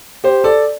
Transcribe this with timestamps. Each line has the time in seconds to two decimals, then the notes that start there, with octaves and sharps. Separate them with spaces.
0.24 G4 C5
0.44 A4 D5